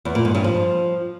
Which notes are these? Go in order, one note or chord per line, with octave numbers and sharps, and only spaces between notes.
E2
A#2
G#2
G2
F3